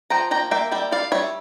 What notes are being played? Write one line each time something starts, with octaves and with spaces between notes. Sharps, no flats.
F3 G5 A#5
A#3 G5 A#5
A#3 E5 G5
G3 E5 G5
G3 D5 F5
G3 C#5 E5